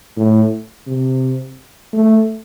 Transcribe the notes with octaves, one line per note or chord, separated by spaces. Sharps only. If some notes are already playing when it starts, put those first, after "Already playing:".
A2
C3
A3